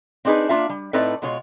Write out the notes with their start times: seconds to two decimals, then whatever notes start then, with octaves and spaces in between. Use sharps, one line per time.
0.25 C4 D4 D#4 G#4 B4
0.49 A#3 D4 F4 E5
0.69 G3
0.93 A2 A3 C4 D#4 B4 D5
1.22 B2 G#3 F4 C#5